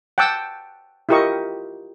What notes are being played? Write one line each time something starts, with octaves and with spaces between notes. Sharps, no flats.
F#5 G5 A5 D6 E6
E4 F4 G4 A#4 D#5 C#6